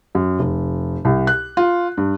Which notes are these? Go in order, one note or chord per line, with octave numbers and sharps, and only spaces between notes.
F#2
F1
C2
F#6
F4
G2